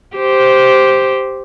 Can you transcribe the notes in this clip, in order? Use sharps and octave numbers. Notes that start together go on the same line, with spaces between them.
G4 C5